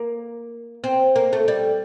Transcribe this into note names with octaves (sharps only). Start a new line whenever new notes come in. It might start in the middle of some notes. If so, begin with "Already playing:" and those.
Already playing: A#3
C4
A#3
A3
G3